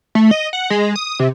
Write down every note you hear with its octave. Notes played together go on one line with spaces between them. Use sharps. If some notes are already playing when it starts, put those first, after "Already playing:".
A3
D#5
F#5
G#3
D#6
C3